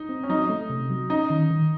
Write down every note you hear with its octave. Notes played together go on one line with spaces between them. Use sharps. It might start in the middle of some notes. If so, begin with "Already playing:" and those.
Already playing: D#4
C4
C#4
F#3 D#4
A3
C3
F#3
C#4 D#4
D#3
D#3